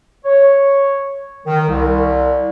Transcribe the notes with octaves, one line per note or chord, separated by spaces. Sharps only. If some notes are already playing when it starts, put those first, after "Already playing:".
C#5
D#3
C2